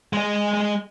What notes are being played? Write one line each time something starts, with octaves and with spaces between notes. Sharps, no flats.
G#3 D#5